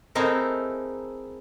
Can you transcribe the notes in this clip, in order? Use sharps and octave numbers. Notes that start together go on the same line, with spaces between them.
A3 C4 D#4 E4 G#4 A#4